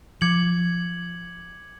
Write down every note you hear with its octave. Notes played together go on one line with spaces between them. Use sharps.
F3 D6 G#6 C#7 F#7